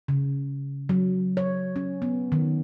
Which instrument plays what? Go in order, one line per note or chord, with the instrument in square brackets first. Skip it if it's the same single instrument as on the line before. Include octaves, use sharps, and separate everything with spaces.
[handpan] C#3
F#3
C#5
C#4
B3
D#3